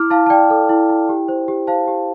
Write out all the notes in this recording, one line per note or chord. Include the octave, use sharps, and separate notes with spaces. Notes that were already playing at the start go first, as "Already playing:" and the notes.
Already playing: E4 D6 F6
E4 F5 A5
A5
D5 G5
A4
E4
E4
G4
C5
G4
C5 F5 A5
G4